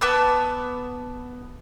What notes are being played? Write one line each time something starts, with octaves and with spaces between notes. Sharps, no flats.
B3 A5 D6 E6